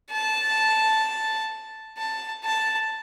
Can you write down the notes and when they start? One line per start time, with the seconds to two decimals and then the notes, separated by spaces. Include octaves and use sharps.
0.11 A5
1.98 A5
2.44 A5